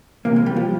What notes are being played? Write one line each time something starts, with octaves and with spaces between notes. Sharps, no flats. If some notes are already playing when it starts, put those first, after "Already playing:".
C3 E3 A#3
G#3
G3
F3